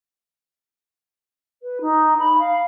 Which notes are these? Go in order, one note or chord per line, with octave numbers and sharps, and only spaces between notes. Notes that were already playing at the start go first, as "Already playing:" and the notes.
B4
D#4
B5
F5